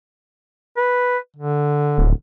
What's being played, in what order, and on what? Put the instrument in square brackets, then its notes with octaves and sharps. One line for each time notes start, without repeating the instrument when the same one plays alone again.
[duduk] B4
D3
[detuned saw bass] D1